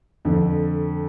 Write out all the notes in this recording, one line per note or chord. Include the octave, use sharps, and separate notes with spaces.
F2 D3